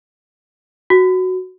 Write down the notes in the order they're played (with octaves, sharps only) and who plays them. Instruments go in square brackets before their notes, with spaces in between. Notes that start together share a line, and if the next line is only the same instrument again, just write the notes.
[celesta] F#4